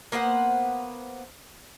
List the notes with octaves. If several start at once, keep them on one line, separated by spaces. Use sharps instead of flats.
A#3 B3 C5 F#5